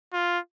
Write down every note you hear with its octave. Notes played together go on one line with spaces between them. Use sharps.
F4